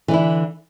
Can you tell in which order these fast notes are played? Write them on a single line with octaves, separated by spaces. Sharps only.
E3 D3 E4